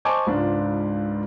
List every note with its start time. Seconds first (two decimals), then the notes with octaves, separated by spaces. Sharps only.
0.05 C5 D#5 G#5 A5 C#6 D6
0.27 C#2 G#2 D4 F4